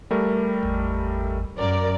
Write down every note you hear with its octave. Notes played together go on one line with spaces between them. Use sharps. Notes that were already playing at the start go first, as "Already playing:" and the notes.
G3 A3 A#4
G#1 E2
F#2 A#4 D5